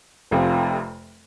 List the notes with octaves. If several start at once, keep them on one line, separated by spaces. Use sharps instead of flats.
F1 F2 C3 F3